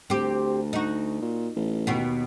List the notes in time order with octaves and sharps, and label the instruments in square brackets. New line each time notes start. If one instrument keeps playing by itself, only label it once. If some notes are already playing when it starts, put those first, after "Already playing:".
[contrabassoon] D2 [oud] C4 G4
[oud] D#4 F#4
[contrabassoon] A#2
A1
[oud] D#2 B2 B3